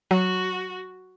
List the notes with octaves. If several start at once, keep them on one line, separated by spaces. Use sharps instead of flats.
F#3 F#4